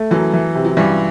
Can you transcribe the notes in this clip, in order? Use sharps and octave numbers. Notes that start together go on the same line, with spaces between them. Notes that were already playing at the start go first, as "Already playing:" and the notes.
Already playing: A3
F#2 E3 F#3
E3
C3
F#3
G2 E3 G3